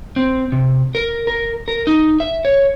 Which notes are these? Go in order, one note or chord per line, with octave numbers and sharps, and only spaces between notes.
C4
C3
A#4
A#4
A#4
D#4
E5
C#5